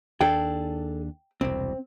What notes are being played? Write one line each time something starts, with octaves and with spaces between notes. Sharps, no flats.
D#2 D4 G#4 A4 G5
E1 C2 C4